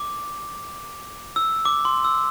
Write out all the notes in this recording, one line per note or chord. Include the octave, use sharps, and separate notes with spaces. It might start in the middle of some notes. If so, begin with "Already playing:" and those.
Already playing: D6
E6
D6
C6
E6